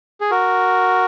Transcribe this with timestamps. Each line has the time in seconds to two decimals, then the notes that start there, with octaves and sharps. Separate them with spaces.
0.21 G#4
0.31 F#4 A#4